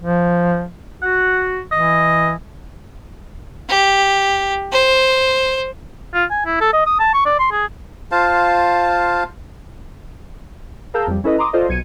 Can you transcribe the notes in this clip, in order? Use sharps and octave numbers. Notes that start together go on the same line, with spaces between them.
F3
F#4 F#5
E3 D#5
G4
C5
F4
G#5
E4
A4
D#5
D#6
A5
C#6
D5
C6
G#4
F4 C5 F5 A5
G#4 A#4 F5 A5 E6 G6
F2 G3
C#4 E4 A4 B4 D#5
A#5 C6 D6 D#6
F4 A4 C5 D5 D#5
B1 G#6 C#7 D#7